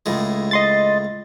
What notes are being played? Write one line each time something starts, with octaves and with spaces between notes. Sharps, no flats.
C#2 A2 G#3
D#5 C6 A6